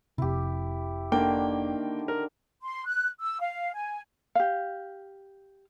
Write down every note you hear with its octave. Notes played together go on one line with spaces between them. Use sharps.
F1 C3 E4 G4
D3 D#3 A#3 D4 G5
A#4
C6
F#6
E6
F5
G#5
G4 F5